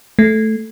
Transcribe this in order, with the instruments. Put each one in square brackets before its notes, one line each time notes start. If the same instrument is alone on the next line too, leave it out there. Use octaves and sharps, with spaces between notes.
[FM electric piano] A3